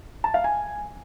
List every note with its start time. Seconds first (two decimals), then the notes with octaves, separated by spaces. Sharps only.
0.24 A5
0.34 F5
0.44 G#5